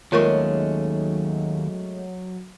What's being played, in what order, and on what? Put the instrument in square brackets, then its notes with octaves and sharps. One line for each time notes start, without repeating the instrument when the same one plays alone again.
[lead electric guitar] D#2 [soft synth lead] F#3 [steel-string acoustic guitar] G#3 A3 C#4 [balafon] F4 A#4 C#6